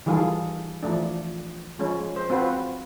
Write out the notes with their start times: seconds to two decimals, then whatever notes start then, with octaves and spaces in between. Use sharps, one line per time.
0.06 D#3 E3 G3 F4 G#4 A4
0.83 E3 F3 A3 D4
1.79 F3 G#3 C#4
2.16 C5
2.30 C4 F4 F#4 B4